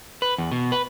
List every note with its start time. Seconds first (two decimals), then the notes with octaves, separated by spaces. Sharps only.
0.22 B4
0.38 E2
0.52 B2
0.72 B4